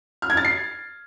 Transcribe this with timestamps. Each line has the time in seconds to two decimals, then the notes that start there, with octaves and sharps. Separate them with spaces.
0.22 F6
0.30 G#6
0.37 A6
0.45 C7